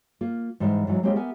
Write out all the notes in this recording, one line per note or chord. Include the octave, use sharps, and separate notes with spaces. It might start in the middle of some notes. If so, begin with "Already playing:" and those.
A#3 F4
G#2 E3 G3 C5 E5
G#2 E3 F#3
G#3 A#3 C4 C#4 G4
B3 G4 A#4 E5 G#5